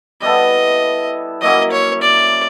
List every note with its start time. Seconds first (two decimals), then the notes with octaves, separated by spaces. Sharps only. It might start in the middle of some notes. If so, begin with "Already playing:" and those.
0.21 G3 B3 E4 A4 D#5
1.41 F#3 A#3 C#4 E4 D#5
1.71 C#5
2.02 D5